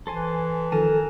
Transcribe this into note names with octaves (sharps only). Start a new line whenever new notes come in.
E3 A4 C5 G#5
D#3 F3 A4 A#4 G#5 A5